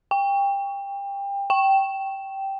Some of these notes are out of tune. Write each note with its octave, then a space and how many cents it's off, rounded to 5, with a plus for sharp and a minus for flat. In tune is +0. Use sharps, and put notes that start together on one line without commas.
G5 +25
G5 -10